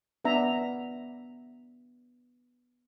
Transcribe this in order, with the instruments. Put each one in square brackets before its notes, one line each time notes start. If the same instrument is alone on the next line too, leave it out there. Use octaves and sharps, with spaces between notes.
[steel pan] B3 D4 E5 A#5